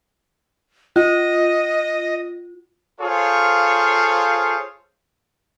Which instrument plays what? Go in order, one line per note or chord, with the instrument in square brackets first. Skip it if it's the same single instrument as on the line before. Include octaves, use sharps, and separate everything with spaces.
[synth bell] F4 [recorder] D#5
[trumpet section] F4 G#4 A4 C5 C#5 F5